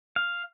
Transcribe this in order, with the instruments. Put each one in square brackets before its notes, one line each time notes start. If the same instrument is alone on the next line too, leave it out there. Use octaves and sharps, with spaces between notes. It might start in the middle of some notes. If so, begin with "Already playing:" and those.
[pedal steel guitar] F5